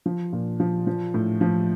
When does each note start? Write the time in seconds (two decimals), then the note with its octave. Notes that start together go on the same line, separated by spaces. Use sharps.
0.06 F3
0.33 A#2
0.60 F3
0.87 F3
1.14 A2
1.41 F3